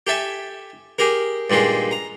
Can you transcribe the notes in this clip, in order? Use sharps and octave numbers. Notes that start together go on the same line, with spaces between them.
G4 A4 E5 G#5
G4 G#4 A#4
G2 A#2 D#3 G#3
A#5